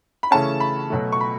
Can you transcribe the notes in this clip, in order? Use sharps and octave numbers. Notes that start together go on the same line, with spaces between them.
B5
C#3 E3 A3 C#4 A5
B5
B2 F#3 A3
C#6
B5